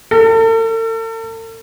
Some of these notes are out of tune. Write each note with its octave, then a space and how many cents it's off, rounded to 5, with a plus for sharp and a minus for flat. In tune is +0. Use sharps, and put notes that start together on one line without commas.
A4 +45